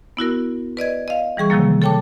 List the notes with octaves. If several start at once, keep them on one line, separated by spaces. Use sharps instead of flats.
B3 E4 F#4 A#4
B4 D5 D#5 G#6
D#5 F5
E3 G3 G#4 C#6
C3 D#3 F3 F#3 A#3
A4 C#5 G5 A5 D6